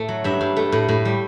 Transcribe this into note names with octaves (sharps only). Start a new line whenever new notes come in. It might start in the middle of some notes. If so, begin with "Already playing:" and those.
Already playing: A2 A3
F#3
G2 E5
G2
A3
A2
A2
G3